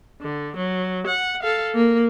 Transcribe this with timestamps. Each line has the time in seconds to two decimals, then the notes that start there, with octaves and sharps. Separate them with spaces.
0.22 D3
0.57 F#3
1.07 F#5
1.43 A4 F5
1.74 A#3